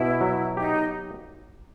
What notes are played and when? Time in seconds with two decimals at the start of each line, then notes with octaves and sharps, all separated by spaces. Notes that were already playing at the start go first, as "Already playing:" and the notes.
Already playing: B2 E4
0.21 F#3
0.57 D#4 G4